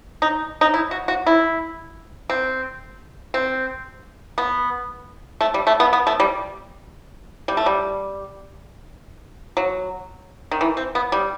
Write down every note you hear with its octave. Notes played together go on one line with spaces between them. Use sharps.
D#4
D#4
E4
F#4
F#4
E4
C4
C4
B3
A3
G3
A3
B3
B3
A3
G3
G3
A3
G3
F#3
D#3
E3
C4
B3
G3